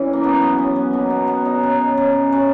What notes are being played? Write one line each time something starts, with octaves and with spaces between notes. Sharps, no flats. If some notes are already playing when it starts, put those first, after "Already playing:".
Already playing: C#3 E3
A#3
F#3 B3
B3
F#3 C#4
B3
B2 A#3
B3
F#3 B3
D#4
C#3
C#3
C#3